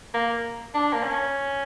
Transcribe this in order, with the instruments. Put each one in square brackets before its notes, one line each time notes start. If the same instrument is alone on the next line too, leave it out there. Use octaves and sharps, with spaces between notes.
[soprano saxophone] A#3
D4
A#3
C#4